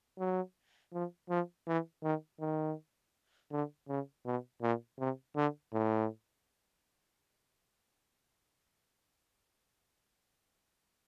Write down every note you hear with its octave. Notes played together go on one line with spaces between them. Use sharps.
F#3
F3
F3
E3
D#3
D#3
D3
C#3
B2
A#2
C3
D3
A2